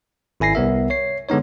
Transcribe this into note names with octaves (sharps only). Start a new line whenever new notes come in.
G#1 E4 G#5 A#6 C7
C2 B3 A#4 E5
C#5 C7
D3 G#3 B3 D#4 C#5